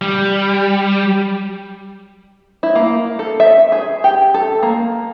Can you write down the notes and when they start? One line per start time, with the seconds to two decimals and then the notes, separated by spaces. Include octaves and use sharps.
0.01 G3
2.63 E4
2.75 A#3
3.19 A4
3.40 E5
3.72 G#4
4.04 G4
4.34 A4
4.63 A#3